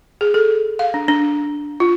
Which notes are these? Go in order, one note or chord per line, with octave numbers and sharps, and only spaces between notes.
G#4
A4
F5
D4
D4
F4